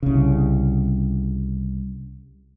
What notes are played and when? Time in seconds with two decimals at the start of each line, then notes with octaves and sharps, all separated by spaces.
0.03 C2 C#3